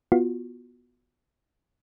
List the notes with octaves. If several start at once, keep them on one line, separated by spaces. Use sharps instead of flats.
B3 F4 F#4